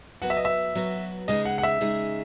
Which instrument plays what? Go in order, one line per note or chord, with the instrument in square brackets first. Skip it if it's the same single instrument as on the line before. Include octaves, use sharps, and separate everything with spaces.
[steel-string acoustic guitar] F#3 B3 F#4 B4 [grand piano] F#5
[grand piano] E5
D#5
E5
[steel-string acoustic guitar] F#3 B3 F#4 B4
[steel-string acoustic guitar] C#3 G#3 D#4 G#4 [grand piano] D#5
[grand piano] F#5
F#5
E5
[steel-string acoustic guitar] C#3 G#3 D#4 G#4